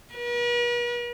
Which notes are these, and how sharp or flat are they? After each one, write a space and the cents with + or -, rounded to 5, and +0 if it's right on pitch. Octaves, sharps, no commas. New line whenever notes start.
B4 -45